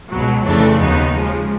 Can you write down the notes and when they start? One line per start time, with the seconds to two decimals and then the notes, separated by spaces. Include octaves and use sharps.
0.10 C#2 B2 F#3
0.44 F2 C#3 E3 A3 D4
0.79 D#2 C#3 F#3 B3 D#4
1.14 C#3 F3 G#3